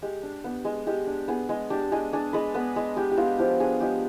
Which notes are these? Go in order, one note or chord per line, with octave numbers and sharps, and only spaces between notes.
G#3 G4
D4
B3
G#3
G#3 G4
D4
B3 G#4
G#3
D4 G4
G#3 G#4
D4 G#4
G#3 B4
B3 B4
G#3
G#3 G4
G4
B3 F4
F3 G4
D4 G#4
G#3 G4